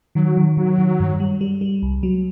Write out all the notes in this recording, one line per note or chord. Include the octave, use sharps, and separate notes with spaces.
D#3 F#3
D#3
D#3 F#3
D#3
G2
G3
G3
G3
C2
F#3